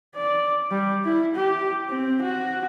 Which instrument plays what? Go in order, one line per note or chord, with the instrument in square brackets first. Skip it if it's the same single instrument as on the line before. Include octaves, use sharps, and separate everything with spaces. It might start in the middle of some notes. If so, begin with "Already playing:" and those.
[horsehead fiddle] D5
G3
E4
G4
C4
F#4